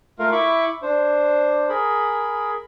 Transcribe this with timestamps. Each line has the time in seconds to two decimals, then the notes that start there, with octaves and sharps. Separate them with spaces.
0.19 A3 F4 A#4 F5
0.32 E4 B5 C#6 D6
0.82 D4 C5
1.69 G#4 A#4 B5